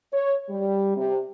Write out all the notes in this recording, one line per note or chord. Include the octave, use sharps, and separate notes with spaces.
C#5
G3
C3